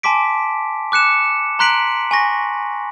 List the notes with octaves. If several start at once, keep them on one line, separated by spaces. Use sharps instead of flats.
G#5 A5 C6 D6 B6 D7
D6 F#6 C#7 E7
A#5 C6 F#6 B6 D7 F#7
G#5 C#6 A#6